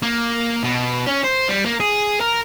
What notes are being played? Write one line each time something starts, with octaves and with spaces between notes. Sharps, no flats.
A#3
B2
C#4
C5
G3
A#3
G#4
A#4